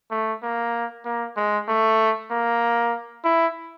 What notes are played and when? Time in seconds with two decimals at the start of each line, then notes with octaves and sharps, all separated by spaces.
0.11 A3
0.43 A#3
1.05 A#3
1.37 G#3
1.68 A3
2.31 A#3
3.25 E4